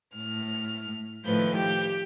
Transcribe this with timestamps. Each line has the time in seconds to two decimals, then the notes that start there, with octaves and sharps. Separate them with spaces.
0.14 A2 F6
1.25 A2 D#3 F3 A3 B4 G6
1.54 G4 G5